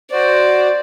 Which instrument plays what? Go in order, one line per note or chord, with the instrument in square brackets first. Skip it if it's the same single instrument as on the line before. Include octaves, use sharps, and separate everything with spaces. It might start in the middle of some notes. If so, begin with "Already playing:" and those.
[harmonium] F#4 C5 [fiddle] D5